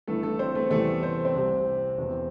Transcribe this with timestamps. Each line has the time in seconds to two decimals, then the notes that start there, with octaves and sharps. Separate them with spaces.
0.08 G1 G2 E3 A3 A4
0.23 A3 A4
0.39 C4 C5
0.55 A3 A4
0.70 E2 C3 E3 G3 A3 A4
1.03 C5
1.25 C4 C5
1.35 C2 C3 G3
1.97 E1 E2 C3